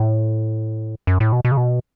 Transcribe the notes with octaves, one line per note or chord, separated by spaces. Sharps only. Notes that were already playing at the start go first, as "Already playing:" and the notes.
Already playing: A2
F#2
A2
B2
B2
C#3
B2